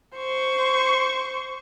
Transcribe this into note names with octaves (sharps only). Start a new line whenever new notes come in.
C5 C#6